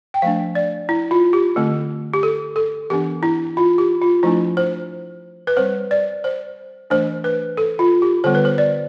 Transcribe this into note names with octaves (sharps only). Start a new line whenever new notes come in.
G5
F3 A3 D4 F5
D5
E4
F4
G4
D3 A3 C4
G4
A4
A4
E3 B3 D4 G4
E4
F4
G4
F4
F3 A3 D4 E4
C5
B4
G3 C4 C5
D5
C5
E3 A3 D4 C5
B4
A4
F4
G4
D3 G3 B3 C5
B4
C5
D5